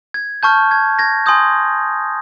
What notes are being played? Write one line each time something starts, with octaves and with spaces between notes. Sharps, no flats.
G#6
A5 C#6 F6 G6
G#6
G#6 A#6
G#5 C6 D#6 G6